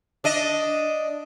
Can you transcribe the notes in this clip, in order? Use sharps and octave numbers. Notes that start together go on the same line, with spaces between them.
D4 D#5